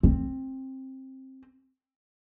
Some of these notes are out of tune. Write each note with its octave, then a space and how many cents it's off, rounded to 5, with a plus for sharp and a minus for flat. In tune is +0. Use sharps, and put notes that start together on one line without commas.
C4 +15